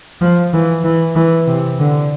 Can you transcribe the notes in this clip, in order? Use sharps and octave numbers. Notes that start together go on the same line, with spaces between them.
F3
E3
E3
E3
C3
D3